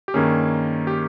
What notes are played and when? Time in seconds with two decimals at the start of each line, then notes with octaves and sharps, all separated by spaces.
0.08 G4
0.14 G2 D#3 A#3 C#4 G#4
0.87 G4